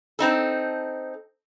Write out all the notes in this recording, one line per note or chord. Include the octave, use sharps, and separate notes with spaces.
C4 D#4 A4